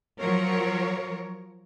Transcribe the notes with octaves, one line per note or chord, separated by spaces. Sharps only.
F3 F#3 A#4 C#5